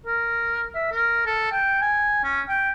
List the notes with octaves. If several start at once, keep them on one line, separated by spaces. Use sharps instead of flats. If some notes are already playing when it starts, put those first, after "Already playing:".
A#4
E5
A#4
A4
G5
G#5
C#4
G5